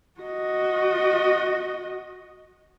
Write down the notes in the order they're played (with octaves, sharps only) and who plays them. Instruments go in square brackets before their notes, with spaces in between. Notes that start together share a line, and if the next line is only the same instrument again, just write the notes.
[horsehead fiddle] F#4 D#5